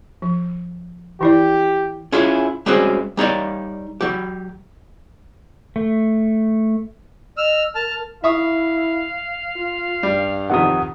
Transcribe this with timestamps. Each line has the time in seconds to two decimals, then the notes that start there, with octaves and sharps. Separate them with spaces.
0.22 F3
1.21 E3 E4 G4 D5
2.12 C#4 E4 F4 G#4 C#5
2.66 G3 G#3 C4 C#4 F#4 G#4
3.17 G3 D#4 C#5 D5
4.01 F#3 G4
5.76 A3
7.37 D#5 E6 F6
7.75 A#4 A5 F6
8.24 E4 E5 F5 C#6 D#6
9.56 F4
10.03 G2 G3
10.50 F2 C3 D#3 F#5 D#6